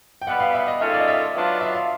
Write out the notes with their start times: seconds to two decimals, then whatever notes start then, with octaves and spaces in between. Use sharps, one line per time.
0.22 G5
0.27 B2 G3 B3 F#5
0.40 F5
0.54 E5
0.68 D#5
0.80 D#3 G#3 C#4 F4 A4 E5
0.93 D5
1.00 D#5
1.08 E5
1.34 F#3 B3 D4 F4
1.61 E5
1.75 F5